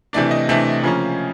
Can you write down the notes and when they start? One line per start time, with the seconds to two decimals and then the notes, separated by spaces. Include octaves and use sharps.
0.13 C3 E3 A3 D4 D5
0.31 D#5
0.49 C3 E3 A3 D4
0.83 C#3 F3 A#3 C#4